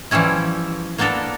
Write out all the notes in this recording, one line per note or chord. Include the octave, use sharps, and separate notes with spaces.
E3 F3 G3 C#4 E4
A#3 B3 D4 A4 A#4